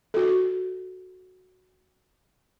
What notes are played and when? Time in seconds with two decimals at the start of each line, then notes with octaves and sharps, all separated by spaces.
0.14 F#4 A4